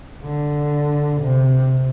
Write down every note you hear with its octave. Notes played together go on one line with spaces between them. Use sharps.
D3
C3